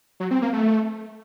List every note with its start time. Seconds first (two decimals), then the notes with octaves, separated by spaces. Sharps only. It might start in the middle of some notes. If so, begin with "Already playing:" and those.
0.20 F#3
0.31 C4
0.42 A#3
0.53 A3